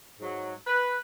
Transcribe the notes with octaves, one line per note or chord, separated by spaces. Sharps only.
G#2 F#3
B4